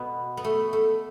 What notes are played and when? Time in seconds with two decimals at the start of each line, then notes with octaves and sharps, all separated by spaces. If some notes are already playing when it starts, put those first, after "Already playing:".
Already playing: B2 B3
0.37 B3
0.44 A3
0.73 A3